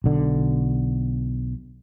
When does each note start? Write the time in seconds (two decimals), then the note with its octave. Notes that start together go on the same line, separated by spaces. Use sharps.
0.04 B1 D3